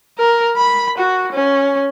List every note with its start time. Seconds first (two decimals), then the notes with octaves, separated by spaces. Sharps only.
0.18 A#4
0.57 B5
0.98 F#4
1.33 C#4